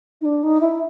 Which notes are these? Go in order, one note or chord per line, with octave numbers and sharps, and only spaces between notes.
D#4
D4
D#4
E4